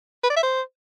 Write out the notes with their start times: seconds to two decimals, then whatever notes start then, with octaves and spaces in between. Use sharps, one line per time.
0.24 B4
0.30 D5
0.37 E5
0.43 C5